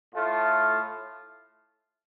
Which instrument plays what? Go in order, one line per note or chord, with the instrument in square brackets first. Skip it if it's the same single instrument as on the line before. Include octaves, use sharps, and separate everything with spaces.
[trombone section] A2 A3 F4